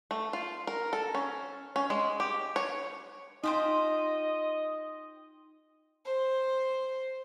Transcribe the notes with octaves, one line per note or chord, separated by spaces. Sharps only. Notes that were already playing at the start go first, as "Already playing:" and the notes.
A3
F4
A#4
A4
C#4
C#4
G#3
G4
C#5
D#4 F4 G4 C5 D#5
C5